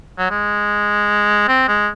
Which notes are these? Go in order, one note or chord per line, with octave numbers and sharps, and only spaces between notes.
F#3
G#3
C4
G#3